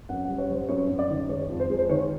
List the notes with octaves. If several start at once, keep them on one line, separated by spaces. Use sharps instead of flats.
F#2 F#5
F#5
G3
C#5
G3 C5
F#2 C#5
F#2
D5
D#3
G#3 C#5
F2
C5
G#3
C5
D#3 C#5